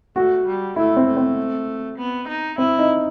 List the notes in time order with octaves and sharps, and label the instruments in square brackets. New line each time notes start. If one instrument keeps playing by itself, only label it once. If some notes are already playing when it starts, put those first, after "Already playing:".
[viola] A3 [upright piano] F#4
[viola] G3
[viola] A3 [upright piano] E4
[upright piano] C4
[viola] A3
[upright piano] C4
[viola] B3
D#4
[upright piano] C4 [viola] E4
[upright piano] D#4